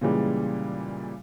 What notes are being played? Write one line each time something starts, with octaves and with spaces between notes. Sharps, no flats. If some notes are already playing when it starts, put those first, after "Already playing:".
A#2 C#3 E3 G3 G#3